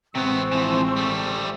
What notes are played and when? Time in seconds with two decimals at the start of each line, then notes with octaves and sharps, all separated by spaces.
0.15 A1 C3 G#3 B3 C4 C5 C#6 E6
0.52 E3 F3
0.96 G3 A3